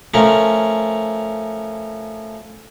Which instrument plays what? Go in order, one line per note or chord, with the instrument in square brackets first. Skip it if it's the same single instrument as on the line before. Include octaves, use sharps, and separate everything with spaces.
[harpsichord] F3 A3 C#4 A#4